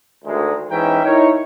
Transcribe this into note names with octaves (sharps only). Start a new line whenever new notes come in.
D2 D#3 G#3
G#2 E3 C#4 D#4 E5 G5
D#4 E4 A#4 C#5